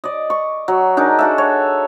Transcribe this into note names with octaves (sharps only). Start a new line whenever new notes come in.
D5 D#5
C#6
F#3
D4 D#4 G#4 A#4
F#4 A4 E5
C#5